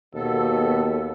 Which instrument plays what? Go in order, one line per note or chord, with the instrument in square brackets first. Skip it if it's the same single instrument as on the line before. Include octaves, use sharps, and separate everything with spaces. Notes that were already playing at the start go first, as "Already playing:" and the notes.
[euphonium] D#2 [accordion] B2 B3 A4